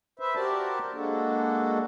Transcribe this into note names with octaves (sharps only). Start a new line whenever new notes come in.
B4 C5 E5
F#4 G4 A#4 C5 D5 A5
G#3 A#3 D4 F#4 A4